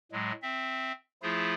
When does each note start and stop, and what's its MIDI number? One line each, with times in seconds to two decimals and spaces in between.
0.12 0.32 45
0.12 0.32 54
0.12 0.32 56
0.42 0.92 60
0.42 0.92 76
1.22 1.54 53
1.22 1.54 57
1.22 1.54 64
1.22 1.54 65
1.22 1.54 68